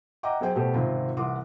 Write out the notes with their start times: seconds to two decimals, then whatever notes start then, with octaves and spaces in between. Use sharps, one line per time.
0.23 D#5 E5 F#5 G5 A#5 D6
0.41 F#2 G#4 C5 G5 G#5
0.55 B2 A3 G4 C5
0.74 G#1 C#2 C3 C4 F4
1.17 C2 E3 F#5 C6 D6 D#6